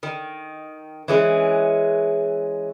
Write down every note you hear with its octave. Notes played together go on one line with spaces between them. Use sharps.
D#3
E3 G#3 C#4